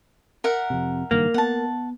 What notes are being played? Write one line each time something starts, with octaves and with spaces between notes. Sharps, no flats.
A#4 E5 F#5
F2 C3
F#1 G2 D#3 A#3
B3 F#5 A5